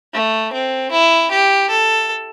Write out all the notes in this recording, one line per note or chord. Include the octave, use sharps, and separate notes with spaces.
A3
C4
E4
G4
A4